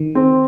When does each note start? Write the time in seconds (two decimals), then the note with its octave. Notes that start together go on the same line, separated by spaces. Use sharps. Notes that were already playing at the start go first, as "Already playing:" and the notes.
Already playing: D#3
0.15 C4